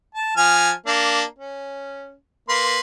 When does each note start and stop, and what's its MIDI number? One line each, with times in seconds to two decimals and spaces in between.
0.15 0.32 81
0.37 0.71 53
0.37 0.71 80
0.37 0.71 89
0.86 1.23 58
0.86 1.23 62
1.38 2.13 61
2.49 2.80 58
2.49 2.80 71
2.49 2.80 84